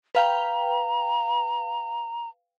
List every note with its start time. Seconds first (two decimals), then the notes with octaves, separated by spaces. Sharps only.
0.15 B4 F5 G5 A#5